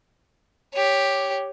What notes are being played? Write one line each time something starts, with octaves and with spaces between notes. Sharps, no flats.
G4 C#5